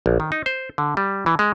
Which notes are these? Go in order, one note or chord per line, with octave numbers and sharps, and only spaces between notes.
A#1
D#3
D#4
C5
D3
G3
E3
G#3